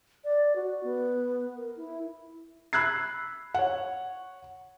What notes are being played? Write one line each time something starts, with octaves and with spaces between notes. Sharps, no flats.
D5
F#4
B3
A#4
E4
B5 E6 F#6 G#6 C7
C#5 F#5